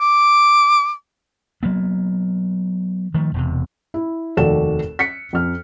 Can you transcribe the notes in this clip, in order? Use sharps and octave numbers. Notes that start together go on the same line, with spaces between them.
D6
F#3 A#3 B3
D#3 F3 A3
E1 E2 C3
E4
F1 D#2 F#4 A4 D5 E7
B6 C#7
F2 F6